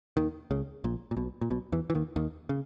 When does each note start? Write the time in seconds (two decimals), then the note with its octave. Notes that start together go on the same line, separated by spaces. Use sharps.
0.17 D#2 D#3
0.51 C#2 C#3
0.84 A#1 A#2
1.11 A#2
1.17 B1 B2
1.41 A#2
1.50 B1 B2
1.72 E2 E3
1.90 E3
1.95 D#2 D#3
2.16 D#2 D#3
2.49 C#3